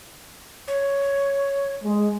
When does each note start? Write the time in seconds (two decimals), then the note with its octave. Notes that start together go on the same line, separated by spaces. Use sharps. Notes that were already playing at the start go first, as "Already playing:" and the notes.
0.68 C#5
1.82 G#3